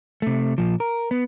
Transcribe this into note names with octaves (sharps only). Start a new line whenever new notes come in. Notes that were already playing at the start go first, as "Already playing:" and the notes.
C3 A3
A#2 F3
A#4
B3